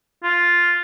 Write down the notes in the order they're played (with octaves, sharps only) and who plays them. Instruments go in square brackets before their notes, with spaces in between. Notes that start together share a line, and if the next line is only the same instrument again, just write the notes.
[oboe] F4